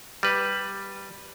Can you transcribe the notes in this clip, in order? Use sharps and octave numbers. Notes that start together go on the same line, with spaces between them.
G3 B4